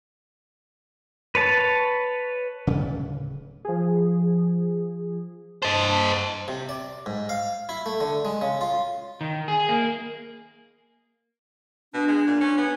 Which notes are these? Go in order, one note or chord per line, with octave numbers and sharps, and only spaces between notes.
B4 C#5 A5
D1 C#3 C#4
F3 G#4
C5 D#5 A5
C3
D5
G#2
F5
E4
A3
D3
G#3
C#3
F4
D#3
G#4
A#3
B2 D4
G#3
A#2
C#4
B3